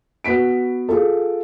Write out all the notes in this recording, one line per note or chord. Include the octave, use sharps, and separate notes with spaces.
B3 F#4 B6 D7
F4 G#4 A4